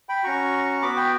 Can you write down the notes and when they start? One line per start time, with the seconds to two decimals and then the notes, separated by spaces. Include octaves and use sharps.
0.09 G5 B5
0.23 C#4 F#4 A#5 C#6
0.82 B3 F#4 B5 D6
0.96 G5 B5